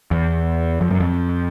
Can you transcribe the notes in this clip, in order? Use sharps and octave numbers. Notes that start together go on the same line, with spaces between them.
E2
F2
F#2
F2